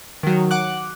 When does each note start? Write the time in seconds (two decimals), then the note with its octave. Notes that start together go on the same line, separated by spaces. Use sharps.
0.23 D#3 F#3
0.51 F#5 D6 F#6